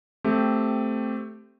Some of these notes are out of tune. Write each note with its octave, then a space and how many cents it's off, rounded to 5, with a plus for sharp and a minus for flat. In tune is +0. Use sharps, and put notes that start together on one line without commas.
A3 +0 C4 -10 G4 +0